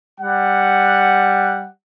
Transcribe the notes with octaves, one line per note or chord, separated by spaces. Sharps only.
G3 F#5